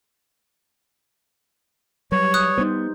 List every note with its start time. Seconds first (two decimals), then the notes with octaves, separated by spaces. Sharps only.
2.12 F#3 G3 B4 C#5
2.34 D#6 F#6
2.58 G3 B3 D#4 C5